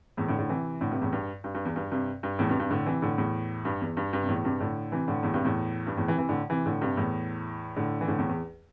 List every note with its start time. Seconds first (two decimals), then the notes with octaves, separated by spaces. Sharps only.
0.17 E2 A2
0.28 A2 D3
0.38 A2 D3
0.49 C3 E3
0.81 A2 D3
0.91 G2 C3
1.01 E2 A2
1.13 G2
1.44 G2
1.55 G2
1.65 E2
1.76 G2
1.92 G2 C3
2.23 G2
2.39 E2 A2
2.49 G2 C3
2.60 G2 C3
2.71 A2 D3
2.86 C3 E3
3.02 A2 D3
3.18 E2 A2
3.65 G2
3.81 E2
3.97 G2
4.13 G2
4.22 C3
4.29 E2 A2
4.44 G2 C3
4.60 A2 D3
4.92 C3 E3
5.08 A2 D3
5.23 E2 A2
5.34 G2 C3
5.45 E2 A2
5.87 G2
5.97 E2 A2
6.08 C3 E3
6.18 C3 E3
6.29 A2 D3
6.50 C3 E3
6.66 A2 D3
6.81 G2 C3
6.97 E2 A2
7.76 A2 D3
8.01 E3
8.08 A2 D3
8.18 E2 A2
8.29 E2